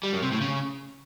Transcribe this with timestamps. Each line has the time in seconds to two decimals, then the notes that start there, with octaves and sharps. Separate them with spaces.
0.03 G3
0.13 F#2
0.22 C3
0.32 A2
0.41 C#3